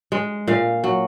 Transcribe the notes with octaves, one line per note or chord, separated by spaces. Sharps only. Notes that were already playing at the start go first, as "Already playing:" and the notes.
G#3
A#2 F5
F#3